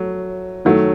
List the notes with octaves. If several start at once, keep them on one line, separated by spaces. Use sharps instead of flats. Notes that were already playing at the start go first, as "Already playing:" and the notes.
Already playing: F#3 A3
D#3 F#3 A3